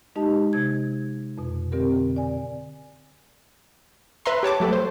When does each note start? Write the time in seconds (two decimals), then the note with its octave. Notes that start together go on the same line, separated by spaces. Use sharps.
0.16 G#3 D#4 G4 D#5 A5
0.53 C3 G#6
1.38 F2 B2
1.72 D3 C4 G4 A#4
2.16 D5 G#5
4.26 B4 E5 A#5 C6
4.43 G4 C#5 A5 D6
4.60 F#3 A3 G4 A4 B4
4.73 C5